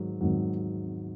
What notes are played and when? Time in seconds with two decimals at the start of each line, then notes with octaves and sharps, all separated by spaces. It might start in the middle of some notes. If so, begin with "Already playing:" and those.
Already playing: G#2 D#3 F#3
0.21 G#2 D#3 F#3